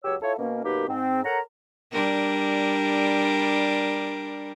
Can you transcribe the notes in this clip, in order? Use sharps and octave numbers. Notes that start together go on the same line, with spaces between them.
C#2 F#3 G4 C#5 E6
E4 F4 A4 C#5
B2 A#3 C#4
F#2 B2 A#3 D#4 G4 B4
G#2 C4
A4 A#4 C#5 F#5 A#5
G3 D4 A#4